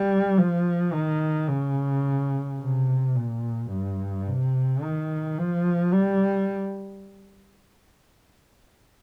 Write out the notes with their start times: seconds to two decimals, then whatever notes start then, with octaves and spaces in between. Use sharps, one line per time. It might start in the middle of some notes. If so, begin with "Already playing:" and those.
Already playing: G3
0.37 F3
0.93 D#3
1.48 C#3
2.60 C3
3.15 A#2
3.71 G2
4.27 C3
4.82 D#3
5.38 F3
5.93 G3